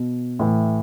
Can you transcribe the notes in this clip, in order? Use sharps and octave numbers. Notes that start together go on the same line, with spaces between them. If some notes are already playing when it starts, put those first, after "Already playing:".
Already playing: B2
A2 E3